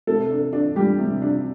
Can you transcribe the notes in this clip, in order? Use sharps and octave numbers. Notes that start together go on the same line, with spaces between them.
C3 A4
D4
D4
G3 G4
C3
D4